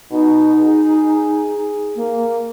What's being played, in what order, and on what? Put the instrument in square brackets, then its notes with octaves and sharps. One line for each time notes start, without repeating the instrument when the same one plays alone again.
[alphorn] B2 [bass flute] D#4
[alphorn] G#4
[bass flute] A#3